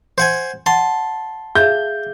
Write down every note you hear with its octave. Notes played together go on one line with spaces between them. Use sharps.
C5 F#5 G#5
F#5 A5 C6
G#4 E5 F5 G6